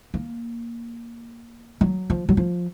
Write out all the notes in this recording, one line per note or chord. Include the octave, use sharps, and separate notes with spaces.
A#3
F#3
F3
F#3
F3